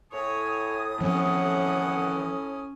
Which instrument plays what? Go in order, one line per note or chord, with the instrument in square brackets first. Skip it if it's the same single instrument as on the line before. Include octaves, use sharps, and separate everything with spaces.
[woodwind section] A2 D#6 [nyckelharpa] C#5 [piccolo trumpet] G#5
[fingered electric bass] E3 F3 C4 [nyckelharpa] C#4 G#5 [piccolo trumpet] F#5